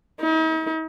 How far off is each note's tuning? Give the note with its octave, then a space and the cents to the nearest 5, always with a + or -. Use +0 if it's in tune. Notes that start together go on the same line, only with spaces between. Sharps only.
D#4 +45